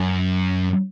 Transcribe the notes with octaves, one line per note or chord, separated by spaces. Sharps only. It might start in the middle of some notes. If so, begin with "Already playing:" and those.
Already playing: F#2